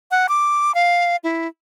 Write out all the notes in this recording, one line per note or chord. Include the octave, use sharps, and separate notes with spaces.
F#5
D6
F5
E4